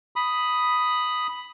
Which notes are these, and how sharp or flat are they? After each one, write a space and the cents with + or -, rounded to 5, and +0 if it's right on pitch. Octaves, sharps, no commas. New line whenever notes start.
B5 +0 D#6 +0